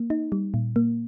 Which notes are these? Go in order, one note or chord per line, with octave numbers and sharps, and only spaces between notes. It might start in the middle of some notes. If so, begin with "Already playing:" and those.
Already playing: A#3
D#4
G3
A#2
A#3